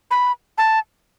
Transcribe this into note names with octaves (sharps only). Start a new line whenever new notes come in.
B5
A5